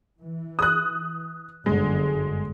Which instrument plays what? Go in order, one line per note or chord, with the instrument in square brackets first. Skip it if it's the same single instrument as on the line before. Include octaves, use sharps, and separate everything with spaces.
[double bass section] E3
[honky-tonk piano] D#6 F#6
[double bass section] G1 F#2 D3 [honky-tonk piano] G#3